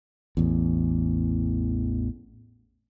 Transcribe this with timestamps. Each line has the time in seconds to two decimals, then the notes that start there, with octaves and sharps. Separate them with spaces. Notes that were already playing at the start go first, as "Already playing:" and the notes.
0.37 A1 E2